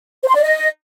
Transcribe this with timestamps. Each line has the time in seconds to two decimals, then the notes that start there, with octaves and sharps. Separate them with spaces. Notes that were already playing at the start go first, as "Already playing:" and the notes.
0.21 C5
0.28 C6
0.35 D5
0.42 D#5